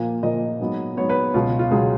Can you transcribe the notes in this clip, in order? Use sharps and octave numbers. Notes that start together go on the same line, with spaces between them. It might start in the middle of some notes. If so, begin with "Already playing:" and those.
Already playing: A#2 F3 A#3
A#2 F3 A#3 D#5
G#2 F#3 B3
G#2 F#3 B3 C#5
B4
C#2 B2 F#3 F4
F4
C#2 B2 F#3 G#4